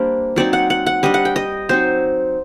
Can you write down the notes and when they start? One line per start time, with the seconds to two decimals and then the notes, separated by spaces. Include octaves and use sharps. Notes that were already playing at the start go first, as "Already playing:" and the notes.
Already playing: G3 A#3 D4 C5
0.36 F#3 C4 D#4 D5
0.53 F#5
0.70 F#5
0.86 F#5
1.03 G3 D4 D#5
1.14 F#5
1.25 G5
1.36 D#5
1.69 F#3 C4 D#4 C5